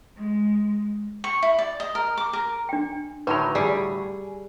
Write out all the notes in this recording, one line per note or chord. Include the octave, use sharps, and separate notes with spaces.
G#3
C#6
E4
D5
D#5
A#4
D6
A#4
D4 G5
A2 D3 F#3 D#4 B4 A5 B5
G3 G#4 D5